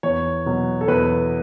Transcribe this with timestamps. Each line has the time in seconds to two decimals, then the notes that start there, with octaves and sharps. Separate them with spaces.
0.03 E2 C#5
0.46 B2 F#3
0.81 A4
0.88 E2 B4